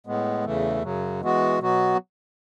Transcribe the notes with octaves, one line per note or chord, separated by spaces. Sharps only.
A2 G#3 B3
E2 C#3 E3 A3
F#2 C#3 F#3
E3 G#3 B3 F#4
B2 F#3 B3 F#4